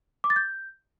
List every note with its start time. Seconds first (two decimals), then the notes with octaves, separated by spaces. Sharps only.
0.24 D6
0.30 A6
0.36 G6